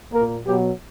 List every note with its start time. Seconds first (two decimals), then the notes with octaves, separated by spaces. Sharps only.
0.13 A#2 A#3 A#4
0.45 B2 F#3 B3 G4